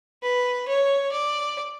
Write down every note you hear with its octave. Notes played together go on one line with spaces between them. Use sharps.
B4
C#5
D5